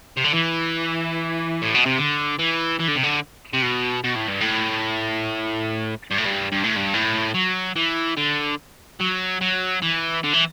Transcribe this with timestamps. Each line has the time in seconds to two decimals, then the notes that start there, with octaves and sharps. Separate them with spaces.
0.17 C3
0.24 D3
0.33 E3
1.62 A2
1.74 B2
1.86 C3
1.98 D3
2.39 E3
2.80 E3
2.88 D3
2.96 C3
3.03 D3
3.53 C3
3.62 B2
4.04 B2
4.16 A2
4.28 G2
4.41 A2
6.11 G2
6.18 A2
6.25 G2
6.52 G2
6.64 A2
6.76 G2
6.94 A2
7.34 F#3
7.76 E3
8.17 D3
9.00 F#3
9.41 F#3
9.82 E3
10.24 D3
10.34 E3